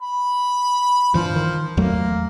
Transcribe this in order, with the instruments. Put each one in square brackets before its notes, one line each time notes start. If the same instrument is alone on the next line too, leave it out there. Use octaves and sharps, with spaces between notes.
[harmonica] B5
[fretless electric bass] G2 E3 [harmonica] F3
[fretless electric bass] D#3
[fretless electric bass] E2 F#3 A3 [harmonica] A#3